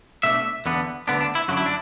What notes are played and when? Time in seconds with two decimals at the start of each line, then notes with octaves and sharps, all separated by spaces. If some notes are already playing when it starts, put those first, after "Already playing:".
0.23 B2 A3 D4 E5
0.66 E2 D3 B3 D4
1.08 D2 D3 B3 D4
1.21 D4
1.35 E4
1.48 F#2 D3 F#3 D4 F#4
1.57 E4
1.66 D4